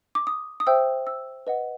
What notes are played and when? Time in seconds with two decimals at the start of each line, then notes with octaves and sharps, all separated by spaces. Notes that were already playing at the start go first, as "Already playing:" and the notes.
0.15 D6
0.27 D#6
0.60 D#6
0.67 C5 E5 G5 E6
1.07 E6
1.47 B4 D#5 F#5